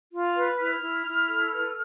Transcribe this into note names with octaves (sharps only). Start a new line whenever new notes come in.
F4
B4
E4 F6
E4
E4
A4
B4